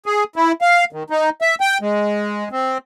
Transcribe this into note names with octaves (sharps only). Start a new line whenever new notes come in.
G#4
E4
F5
D#3
D#4
E5
G5
G#3
C4